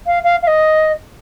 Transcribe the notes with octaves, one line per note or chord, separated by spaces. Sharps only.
F5
F5
F5
D#5